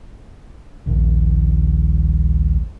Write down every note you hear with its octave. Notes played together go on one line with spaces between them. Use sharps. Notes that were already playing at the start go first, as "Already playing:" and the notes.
D#1 A#1 D#2